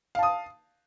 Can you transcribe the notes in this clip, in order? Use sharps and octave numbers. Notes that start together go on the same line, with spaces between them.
F5 A5 D#6